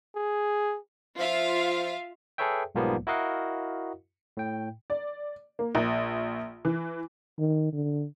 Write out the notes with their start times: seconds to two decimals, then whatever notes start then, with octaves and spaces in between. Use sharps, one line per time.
0.16 G#4
1.19 F3 F4 E5 F5
2.38 G#4 A4 B4 C#5 E5 G5
2.75 B1 G#2 F3 G3 A#3 B3
3.07 E4 F#4 A#4 D#5 F5 F#5
4.37 A2 G5
4.90 D5
5.59 A#3
5.75 A#1
6.65 E3
7.38 D#3
7.73 D3